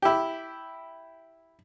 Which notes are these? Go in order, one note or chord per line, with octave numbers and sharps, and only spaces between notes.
E4 G4